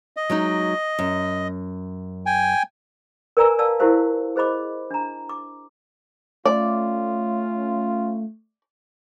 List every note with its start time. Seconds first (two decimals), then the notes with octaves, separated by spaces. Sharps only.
0.17 D#5
0.30 F#3 G#3 D#4
0.99 F#2
2.26 G5 G#5
3.37 A#4 B4 D5 G#5 A#5 E6
3.59 D5 F5 A5 E6
3.80 E4 F4 G4 A#4 C5 F5
4.36 G#4 C5 D#5 B5 D6
4.91 D4 A#5
5.29 D6
6.45 A3 C#4 F4 D5